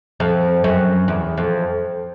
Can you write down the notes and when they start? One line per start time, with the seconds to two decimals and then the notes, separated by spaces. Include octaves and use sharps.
0.20 F2
0.64 F#2
1.08 E2
1.38 F2